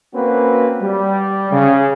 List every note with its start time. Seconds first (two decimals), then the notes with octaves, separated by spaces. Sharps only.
0.14 A#3 C4 C#4 F#4 B4
0.82 G3
1.51 C#3